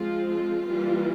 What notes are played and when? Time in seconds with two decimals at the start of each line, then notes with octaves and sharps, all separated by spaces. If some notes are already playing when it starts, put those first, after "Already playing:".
Already playing: F3 G#3 C4 F4
0.30 F4
0.68 E3 G3 A#3